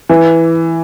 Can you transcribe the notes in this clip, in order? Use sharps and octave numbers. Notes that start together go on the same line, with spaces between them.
E3